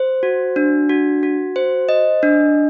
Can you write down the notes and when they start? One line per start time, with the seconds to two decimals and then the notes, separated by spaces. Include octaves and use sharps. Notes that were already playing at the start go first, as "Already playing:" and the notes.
Already playing: C5
0.23 F#4
0.56 D4
0.90 F#4
1.23 F#4
1.56 C5
1.89 D#5
2.23 D4